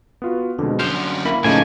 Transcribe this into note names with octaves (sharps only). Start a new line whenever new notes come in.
B3 F4 F#4
F2 B2 D3 G#3
F#2 D3 C6 F6 G6 E7
A#3 E4 B5
A2 C#3 F3 A3 A#3 D#4 G#5